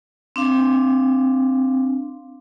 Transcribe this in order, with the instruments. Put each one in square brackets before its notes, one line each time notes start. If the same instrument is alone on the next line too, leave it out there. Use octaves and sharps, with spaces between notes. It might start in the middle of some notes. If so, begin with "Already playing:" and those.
[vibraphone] C4 D4 F5